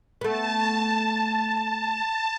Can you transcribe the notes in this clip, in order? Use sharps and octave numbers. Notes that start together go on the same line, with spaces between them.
A3 B3 A5